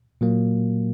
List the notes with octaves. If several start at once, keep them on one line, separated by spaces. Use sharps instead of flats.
A#2 F#3 A#3